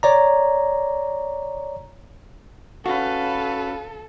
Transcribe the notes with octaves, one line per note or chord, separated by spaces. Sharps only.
C#5 D5 A#5
C#4 F#4 A4 B4 F5